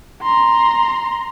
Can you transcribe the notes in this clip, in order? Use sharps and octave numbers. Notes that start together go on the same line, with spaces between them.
A#5 C6